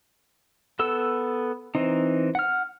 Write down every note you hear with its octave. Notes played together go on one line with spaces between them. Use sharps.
B3 A4 E6
E3 C4 D#4
F#5 F6